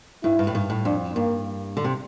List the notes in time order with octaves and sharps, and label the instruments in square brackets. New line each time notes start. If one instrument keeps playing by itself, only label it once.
[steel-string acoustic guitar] G2 [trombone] E4
[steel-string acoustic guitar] G2
A2
G2
A2
[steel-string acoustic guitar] F2 [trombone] D4
[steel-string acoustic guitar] G2 [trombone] A#3
[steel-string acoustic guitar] D3
C3